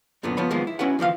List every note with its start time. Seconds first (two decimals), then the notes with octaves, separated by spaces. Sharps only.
0.23 F#2 A#2 D3 A3 B3
0.37 C#2 F3 B3 C#5 B5
0.50 D#2 F3 G#3 A#3 B3
0.67 E4
0.79 C#4 E4 F#4 B4 F#5
0.99 D2 E3 F3 F5